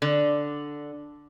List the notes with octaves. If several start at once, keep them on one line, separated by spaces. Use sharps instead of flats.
D3